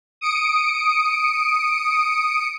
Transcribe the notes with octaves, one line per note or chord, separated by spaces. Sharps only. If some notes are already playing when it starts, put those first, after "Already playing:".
D#6 C#7 D7